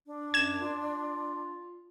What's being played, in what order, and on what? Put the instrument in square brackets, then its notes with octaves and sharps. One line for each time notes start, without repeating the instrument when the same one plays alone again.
[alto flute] D4
[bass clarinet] F#2 [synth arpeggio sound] G#6 E7
[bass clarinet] F4